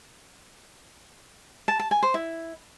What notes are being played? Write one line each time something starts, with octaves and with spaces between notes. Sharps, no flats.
A5
A5
G#5
C5
E4